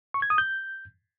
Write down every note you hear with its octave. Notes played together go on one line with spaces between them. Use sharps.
C#6
G#6
D#6
G6